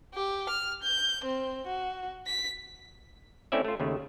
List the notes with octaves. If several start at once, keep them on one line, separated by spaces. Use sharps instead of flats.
G4
F6
G6
C4
F#4
B6
A3 C4 C#4 E4 D5 E5
A3 F4
D#2 C#3 A3